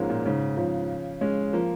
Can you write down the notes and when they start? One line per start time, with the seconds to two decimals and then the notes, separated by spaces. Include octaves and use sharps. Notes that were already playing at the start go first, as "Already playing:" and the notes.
Already playing: G#2 F3 G#3 A#3 C#4
0.10 A#2
0.26 G#2 C#3
0.57 C#3 F3
1.21 G#3 C#4
1.53 F3 A#3